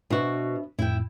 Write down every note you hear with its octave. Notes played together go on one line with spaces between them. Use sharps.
B2 D4 F#4 C5 E5
F2 A2 E4 G5